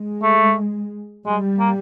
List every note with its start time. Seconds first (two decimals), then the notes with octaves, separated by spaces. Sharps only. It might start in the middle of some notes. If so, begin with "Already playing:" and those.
Already playing: G#3
0.23 A3
1.25 G3 G#3
1.59 A#3